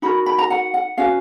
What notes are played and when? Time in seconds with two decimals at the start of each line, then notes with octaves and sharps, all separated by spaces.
0.02 D#4 F#4 A#4 B5
0.26 B5
0.38 A#5
0.50 F#5
0.74 F#5
0.97 C#4 F#4 B4 F5